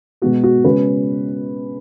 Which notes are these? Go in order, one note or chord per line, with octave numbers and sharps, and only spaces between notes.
B2 G#3 B3 F#4
F#4
C#3 G#3 C#4 B4